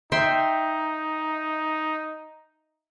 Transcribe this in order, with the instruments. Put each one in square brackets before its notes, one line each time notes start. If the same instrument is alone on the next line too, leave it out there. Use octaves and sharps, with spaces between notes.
[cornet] D#4 [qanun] E5 G5 C6